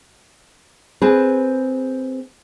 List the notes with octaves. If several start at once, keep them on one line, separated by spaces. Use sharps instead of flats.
C4 G#4 B4